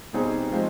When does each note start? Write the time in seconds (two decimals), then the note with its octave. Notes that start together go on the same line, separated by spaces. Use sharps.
0.13 B2 G3 C4 D#4 G#4
0.52 F3 G#3 C4